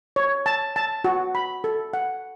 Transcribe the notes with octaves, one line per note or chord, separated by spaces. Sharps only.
C#5
A5
A5
F#4
B5
A4
F#5